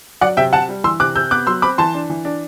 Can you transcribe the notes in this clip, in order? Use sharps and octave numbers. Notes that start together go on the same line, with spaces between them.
F#3 D5 F#5
C3 E5 G5
C3 F#5 A5
G3
E3 C6 E6
C3 D6 F#6
C3 E6 G6
B3 D6 F#6
F#3 C6 E6
C4 B5 D6
E3 A5 C6
D4
E3
D4